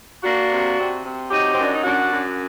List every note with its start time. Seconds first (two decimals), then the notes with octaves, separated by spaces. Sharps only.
0.23 A#3 D4 F#4
0.50 C3
0.77 C3
1.04 C3
1.30 F#3 D#4 G4
1.53 F#2 C4
1.64 D4
1.74 D#4
1.84 F#2 D4 F#4
2.11 F#2